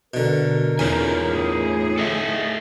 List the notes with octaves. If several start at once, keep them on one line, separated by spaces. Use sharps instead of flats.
B2 D3 A#4
E2 C#3 D#4 F4 G#5
A2 G#4
A4 D#5 E5